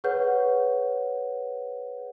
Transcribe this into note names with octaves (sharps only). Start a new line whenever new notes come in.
G#4 B4 C#5 F#5 G6